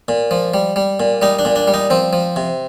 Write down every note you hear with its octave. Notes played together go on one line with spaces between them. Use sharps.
A#2
F3
G3
G3
A#2
G3 D#4
D4
A#2
D4
G3
D#4
F3 C4
F3
C3